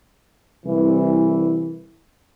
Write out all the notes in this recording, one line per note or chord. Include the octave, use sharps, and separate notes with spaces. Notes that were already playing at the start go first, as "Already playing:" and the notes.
C2 E3